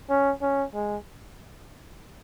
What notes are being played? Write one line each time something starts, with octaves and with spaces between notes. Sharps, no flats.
C#4
C#4
G#3